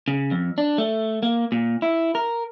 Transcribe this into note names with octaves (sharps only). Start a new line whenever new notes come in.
C#3
F2
D4
A3
A#3
A#2
E4
A#4